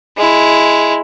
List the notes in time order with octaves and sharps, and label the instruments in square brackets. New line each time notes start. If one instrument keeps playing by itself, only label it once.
[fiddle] G#3 E4